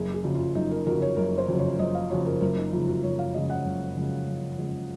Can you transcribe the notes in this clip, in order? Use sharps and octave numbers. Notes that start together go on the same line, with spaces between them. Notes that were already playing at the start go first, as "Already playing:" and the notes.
Already playing: F#1 G#4
G#4
F2 C#3 F#3
F4
F#1 D#4
A#4
F2 C#3 F#3 A#4
C#5
F#1 A#4
C5
F2 C#3 F#3
C#5
F#1 D#5
F5
F2 C#3 F#3 C#5
A#4
F#1 A#4
D#4
F2 C#3 G#3 F4
F#4
F#1 C#5
F5
F2 C#3 G#3 D#5
F#5
F#1
F2 C#3 G#3
F#1
F2 C#3 G#3